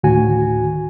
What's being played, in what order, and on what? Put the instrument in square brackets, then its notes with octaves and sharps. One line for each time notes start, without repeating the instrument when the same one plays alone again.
[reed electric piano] D2 A2 D#3 F#4 G#5